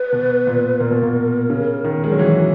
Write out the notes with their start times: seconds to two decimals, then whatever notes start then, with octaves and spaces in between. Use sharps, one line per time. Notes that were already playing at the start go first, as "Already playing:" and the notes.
Already playing: B4
0.13 B2
0.47 A#2
0.80 A#2 A#4
0.91 B2
1.02 A#2
1.50 C#3
1.84 D#3
2.04 G#3
2.12 F#3
2.19 E3 F#4